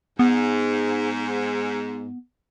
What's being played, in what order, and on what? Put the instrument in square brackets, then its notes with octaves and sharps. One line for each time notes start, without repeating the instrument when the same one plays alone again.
[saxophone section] G#2 [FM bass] B3